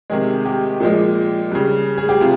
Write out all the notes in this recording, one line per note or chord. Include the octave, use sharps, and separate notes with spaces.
C3 D#3 G#3 G#4
G4
A#2 F3 G#3
C#3 G3
G#4
G4
C3 F4